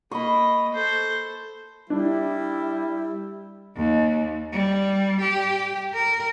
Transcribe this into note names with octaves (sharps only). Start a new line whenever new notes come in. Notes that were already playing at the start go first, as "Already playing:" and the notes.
A#3 D#5 B5 C#6
A4 C5
G3 D4 E4
D#2
G3
G4
A#4